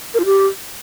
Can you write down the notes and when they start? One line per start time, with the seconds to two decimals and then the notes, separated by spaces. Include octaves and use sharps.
0.14 A#4
0.20 F4
0.25 G4